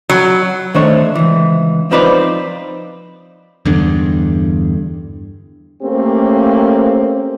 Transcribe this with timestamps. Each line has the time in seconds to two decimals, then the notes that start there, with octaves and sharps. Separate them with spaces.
0.09 F#3
0.74 D#3 A3 D4 C5 C#5
1.15 C#2 E3
1.91 F3 C4 D#4 B4 C5 D5
3.65 E2 G2 D3
5.83 A3 A#3 C4 C#4 G4